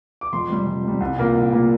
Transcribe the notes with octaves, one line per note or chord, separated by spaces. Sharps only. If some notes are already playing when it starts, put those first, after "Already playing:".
D6
F2 C6
C3 G3
F2
C3 G3
C2
A#2 A#3
C2
A#2 A#3